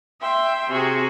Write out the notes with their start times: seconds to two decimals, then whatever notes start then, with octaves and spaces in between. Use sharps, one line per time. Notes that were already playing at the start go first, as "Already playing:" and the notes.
0.21 E5 G5 C6
0.70 C3 F#4 G#4